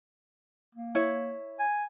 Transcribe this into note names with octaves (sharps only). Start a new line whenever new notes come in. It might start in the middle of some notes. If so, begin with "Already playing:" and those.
A#3
E4 C#5 E5
G#5